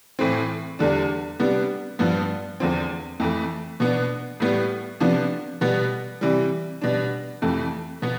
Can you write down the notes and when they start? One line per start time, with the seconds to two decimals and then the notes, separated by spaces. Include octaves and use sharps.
0.19 A2 E3 A3 C4
0.79 E2 D3 G3 D4
1.40 C3 G3 B3 D4
1.99 G2 F3 B3
2.60 E2 D3 F3 C4
3.20 F2 E3 A3
3.80 B2 B3 D4
4.40 A2 G3 B3
5.00 C3 F3 B3 D4
5.61 B2 G3 B3
6.21 C3 E3 G3
6.81 B2 G3 D4
7.42 F2 C3 E3 A3
8.02 B2 B3